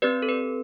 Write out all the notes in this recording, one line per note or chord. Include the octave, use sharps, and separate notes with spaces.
C4 G4 B4 D5
A4
B4